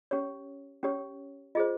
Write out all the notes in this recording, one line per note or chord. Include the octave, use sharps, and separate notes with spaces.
C#4 G4 C#5
C#4 G4 C#5
F4 G#4 C5 D#5